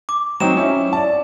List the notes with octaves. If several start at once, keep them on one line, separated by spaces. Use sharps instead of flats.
D6
F#3 C4 D#4 E7
C#4 E4
D5 A5